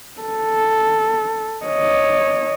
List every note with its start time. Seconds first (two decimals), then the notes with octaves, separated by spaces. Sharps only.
0.21 A4
1.66 C#5 D#5